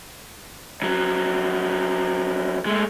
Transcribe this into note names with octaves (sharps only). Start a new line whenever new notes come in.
F2 F#3
G#3 A3